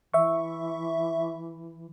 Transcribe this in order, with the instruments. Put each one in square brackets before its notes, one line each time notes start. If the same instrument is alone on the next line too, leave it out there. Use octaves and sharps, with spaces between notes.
[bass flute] E3 [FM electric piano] E5 C#6